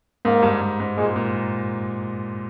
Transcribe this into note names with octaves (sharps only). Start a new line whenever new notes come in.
G#2 A#3
G2
G2
G#2
A#2 G#3
A#2